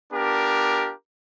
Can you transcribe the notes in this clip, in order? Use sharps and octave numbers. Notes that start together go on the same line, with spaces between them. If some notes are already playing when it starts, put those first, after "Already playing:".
B3 D4 F4 G4 A#4